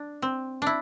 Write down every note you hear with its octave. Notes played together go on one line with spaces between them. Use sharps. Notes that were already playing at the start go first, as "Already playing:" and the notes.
Already playing: D4
C4
D4 E4